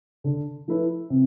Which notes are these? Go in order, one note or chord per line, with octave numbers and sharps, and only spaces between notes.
D3
F3 A3 E4 B4
C3